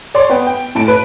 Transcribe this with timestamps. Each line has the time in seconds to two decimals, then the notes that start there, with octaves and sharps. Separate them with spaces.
0.14 C#5 D5 C6
0.29 B3 G5
0.47 G5
0.75 A2 A5 D7
0.88 B4